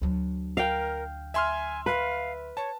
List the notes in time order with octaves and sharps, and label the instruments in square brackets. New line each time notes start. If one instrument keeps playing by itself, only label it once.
[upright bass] D2 F#3
[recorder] A#4 [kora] F5 G5
[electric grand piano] E5 C6 F6 [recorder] G#5
[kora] B4 [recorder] F5
[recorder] C#5 [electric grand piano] A5